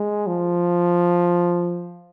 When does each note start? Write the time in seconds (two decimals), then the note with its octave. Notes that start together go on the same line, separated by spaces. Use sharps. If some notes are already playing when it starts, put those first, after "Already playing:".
Already playing: G#3
0.27 F3